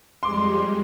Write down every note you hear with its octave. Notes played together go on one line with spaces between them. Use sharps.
F2 G3 G#3 C6 D6